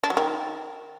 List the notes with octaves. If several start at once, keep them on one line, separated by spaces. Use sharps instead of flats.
D4
F#3
D#3